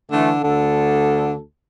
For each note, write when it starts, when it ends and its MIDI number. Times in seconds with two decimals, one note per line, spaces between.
0.12 0.40 50
0.12 0.31 52
0.12 0.31 57
0.44 1.40 38
0.44 1.34 50
0.44 1.40 69